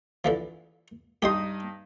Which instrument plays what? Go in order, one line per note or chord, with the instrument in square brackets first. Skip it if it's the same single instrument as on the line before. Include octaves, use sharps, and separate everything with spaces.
[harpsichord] D3 E3 F3
[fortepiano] G2 D#4 D#6 [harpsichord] G4 D#5 C6